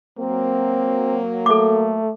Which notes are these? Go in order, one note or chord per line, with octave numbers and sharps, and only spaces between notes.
F#3 A#3 C4
A3 A4 D6